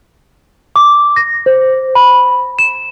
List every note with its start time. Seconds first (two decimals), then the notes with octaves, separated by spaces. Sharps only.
0.76 D6
1.16 A#6
1.46 C5
1.95 B5
2.59 E7